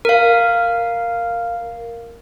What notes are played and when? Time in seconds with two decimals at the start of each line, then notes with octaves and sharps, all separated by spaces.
0.05 A#4 F5